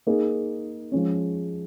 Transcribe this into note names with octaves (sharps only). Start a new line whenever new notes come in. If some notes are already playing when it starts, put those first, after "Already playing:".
A#3 D#4 G#4
F3 G#3 C#4